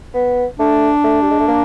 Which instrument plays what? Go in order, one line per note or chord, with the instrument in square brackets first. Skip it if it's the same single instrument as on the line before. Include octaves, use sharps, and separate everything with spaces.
[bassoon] B3
[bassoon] A3 [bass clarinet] D4
[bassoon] A3
G3
G#3
A3
A#3